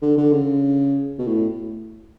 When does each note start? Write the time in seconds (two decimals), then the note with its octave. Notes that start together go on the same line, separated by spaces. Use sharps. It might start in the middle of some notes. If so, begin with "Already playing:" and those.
0.02 D3
0.17 D3
0.32 C#3
1.18 B2
1.27 A2